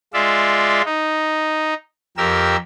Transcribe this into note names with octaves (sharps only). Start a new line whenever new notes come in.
G#3 F4 D5 E5
D#4
F2 G4 A#4 E6